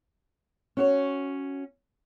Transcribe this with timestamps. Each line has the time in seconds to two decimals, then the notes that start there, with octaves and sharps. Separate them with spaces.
0.77 C#4 F#4 C#5